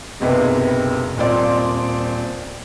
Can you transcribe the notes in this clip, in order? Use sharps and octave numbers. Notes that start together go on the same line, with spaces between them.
F#1 B1 C3 G#4 B4
D#1 A#2 C4 D5